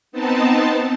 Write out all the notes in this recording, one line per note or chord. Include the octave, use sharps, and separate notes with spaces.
B3 C4 D#4 A5